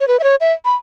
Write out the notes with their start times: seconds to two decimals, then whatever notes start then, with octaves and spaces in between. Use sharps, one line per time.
0.01 C#5
0.08 B4
0.20 E5
0.24 C#5
0.41 E5
0.65 B5